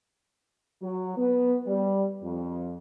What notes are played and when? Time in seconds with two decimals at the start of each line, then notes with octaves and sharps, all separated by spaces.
0.82 F#3
1.17 B3
1.66 G3
2.23 F2